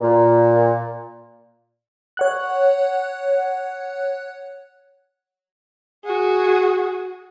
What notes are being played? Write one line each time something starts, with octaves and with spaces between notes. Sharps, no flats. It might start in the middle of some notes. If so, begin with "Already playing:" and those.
A#2
C#5 F#5 F#6
F#4 G#4